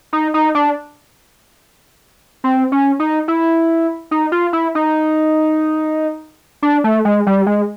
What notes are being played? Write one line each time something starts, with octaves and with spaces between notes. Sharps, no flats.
D#4
D#4
D4
C4
C#4
D#4
E4
D#4
F4
E4
D#4
D4
A3
G#3
G3
G#3